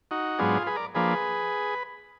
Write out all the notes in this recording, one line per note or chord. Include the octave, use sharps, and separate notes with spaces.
D#4 F#4
G#2 F#3 B3 D4 F4 G#4
G#4 B4
A#4 D5
F3 A#3 D4 G#4 B4